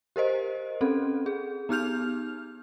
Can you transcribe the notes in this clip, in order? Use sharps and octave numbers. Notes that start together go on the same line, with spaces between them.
G4 A#4 C5 D#5
C4 C#4 A4
G#4
B3 D#4 G4 F6 G6 F7